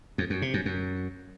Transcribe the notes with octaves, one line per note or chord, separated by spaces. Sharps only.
F2
F#2
C3
F#2
F#2